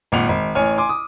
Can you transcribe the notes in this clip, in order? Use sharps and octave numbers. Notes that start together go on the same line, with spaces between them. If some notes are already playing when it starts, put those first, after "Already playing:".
G#1 A#2 F#5 F7
G#1
A1 C#5 G#5 F6
G#5 C6 D6
D#6